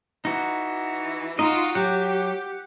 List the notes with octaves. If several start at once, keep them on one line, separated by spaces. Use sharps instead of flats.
E3 D#4 F#4
D#4 F4 F#4 D#5
F#3 G4 F#5